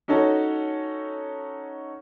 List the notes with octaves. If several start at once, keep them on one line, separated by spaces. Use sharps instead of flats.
C#4 D#4 F#4 A4 C#5